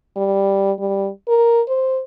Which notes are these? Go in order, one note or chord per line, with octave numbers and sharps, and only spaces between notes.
G3
G3
A#4
C5